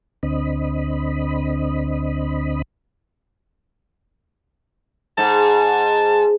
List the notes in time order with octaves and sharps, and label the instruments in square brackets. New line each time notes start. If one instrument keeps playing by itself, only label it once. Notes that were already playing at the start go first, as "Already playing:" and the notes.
[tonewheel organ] D2 D3 C4 D#5 B5
[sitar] G#2 [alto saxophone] A5